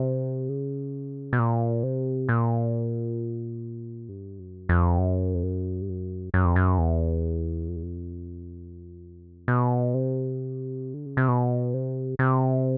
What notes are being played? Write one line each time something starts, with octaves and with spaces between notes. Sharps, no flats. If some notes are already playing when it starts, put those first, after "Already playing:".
Already playing: C3
C#3
B2
A#2
C3
A#2
G2
F#2
F2
F#2
F2
F#2
G2
F#2
F#2
F2
F#2
E2
F2
E2
F2
B2
C3
D3
C#3
C3
B2
C3
C3